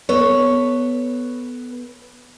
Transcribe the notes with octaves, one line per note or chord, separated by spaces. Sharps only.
B3 A4 B4 C#5